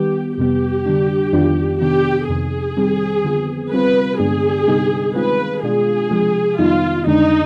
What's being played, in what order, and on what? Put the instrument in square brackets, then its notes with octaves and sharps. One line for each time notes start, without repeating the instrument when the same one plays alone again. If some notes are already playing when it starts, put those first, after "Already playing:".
Already playing: [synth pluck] D#3 G3 B3 [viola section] G4
[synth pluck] F2 C3 G3 B3 [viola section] G4
[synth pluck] D3 G3 D4
F2 D#3 B3 D4 F4
[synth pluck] C3 D#3 B3 D4 [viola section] G4
[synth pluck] F2 C3 D#3 [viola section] G#4
[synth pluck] D#3 G3 C4
D3 F3 B3
[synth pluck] C3 G3 C4 F4 [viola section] B4
[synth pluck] G2 D3 G#3 B3 D4 [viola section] G#4
[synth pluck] C3 G3 B3 D#4
[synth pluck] D#3 G#3 C4 F4 [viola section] B4
[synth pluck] B2 G#3 D4 F4 [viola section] G#4
[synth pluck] C3 F3 G#3
[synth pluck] F2 D#3 G3 B3 D#4 [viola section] F4
[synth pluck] F2 D3 G#3 D4 [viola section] D#4